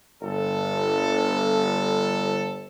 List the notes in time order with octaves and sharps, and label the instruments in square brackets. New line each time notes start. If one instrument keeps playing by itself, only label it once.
[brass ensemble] G1 A4